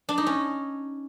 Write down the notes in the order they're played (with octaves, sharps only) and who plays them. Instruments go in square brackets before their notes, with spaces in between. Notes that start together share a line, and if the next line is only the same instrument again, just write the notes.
[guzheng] D4
D#4
C#4